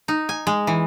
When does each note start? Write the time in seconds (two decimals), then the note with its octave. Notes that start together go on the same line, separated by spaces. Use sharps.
0.08 D#4
0.29 G#5
0.47 G#3
0.67 E3